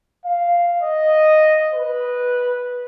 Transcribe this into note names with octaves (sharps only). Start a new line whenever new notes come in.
F5
D#5
B4